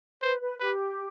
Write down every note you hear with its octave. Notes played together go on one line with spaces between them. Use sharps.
B4 C5
B4
G4 B4